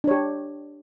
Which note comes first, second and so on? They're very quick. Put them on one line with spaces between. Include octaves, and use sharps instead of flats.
D4 C#5 G4